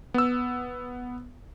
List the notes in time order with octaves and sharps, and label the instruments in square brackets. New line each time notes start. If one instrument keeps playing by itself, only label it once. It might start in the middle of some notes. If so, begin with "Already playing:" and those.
[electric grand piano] B3 E6